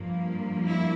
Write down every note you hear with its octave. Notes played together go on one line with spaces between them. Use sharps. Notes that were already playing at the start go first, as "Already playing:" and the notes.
Already playing: G2 F3 A#3
E4